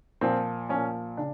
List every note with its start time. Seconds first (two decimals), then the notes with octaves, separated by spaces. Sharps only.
0.21 A#2 F3 C4
0.69 A#2 F3 C#4
1.17 C#3 D4